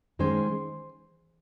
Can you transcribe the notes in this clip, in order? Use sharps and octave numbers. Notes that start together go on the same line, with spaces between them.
D#3 G#3 C#4 C5